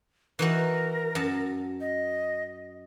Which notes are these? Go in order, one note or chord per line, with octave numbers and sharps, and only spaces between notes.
E3 D#4 F#4 A#4
F#2 A5
D#5